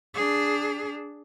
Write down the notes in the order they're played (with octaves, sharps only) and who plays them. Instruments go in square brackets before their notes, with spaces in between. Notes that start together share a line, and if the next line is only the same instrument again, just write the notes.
[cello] D4 G#4